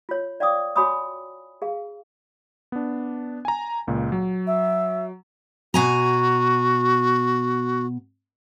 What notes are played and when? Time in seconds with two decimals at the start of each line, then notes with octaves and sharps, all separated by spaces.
0.09 F4 C#5
0.40 D5 F5 G5 D6 D#6
0.76 F#4 C#5 G#5 B5 D6 D#6
1.62 G#4 F5
2.72 B3 D4
3.45 G#5 A#5
3.87 C#2 A#2
4.12 F#3
4.47 E5
5.74 B2 F#4 G#5 A#5